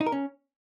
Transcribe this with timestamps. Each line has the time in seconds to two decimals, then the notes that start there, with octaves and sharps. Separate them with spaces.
0.01 D#4
0.06 A#4
0.12 C#4